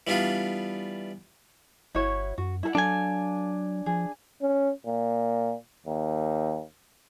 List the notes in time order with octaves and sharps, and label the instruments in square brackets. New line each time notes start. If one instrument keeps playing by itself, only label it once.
[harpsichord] E3 G3 B3 D4 F4
[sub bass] G1 [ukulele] E4 F#4 C#5
[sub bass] F#2 [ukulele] F#4
[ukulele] E4 A4 F#5
[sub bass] F#3 [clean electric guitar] D4 G#5 [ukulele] A4 F5
[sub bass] F3 [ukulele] G#4
[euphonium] C#4
A#2
D#2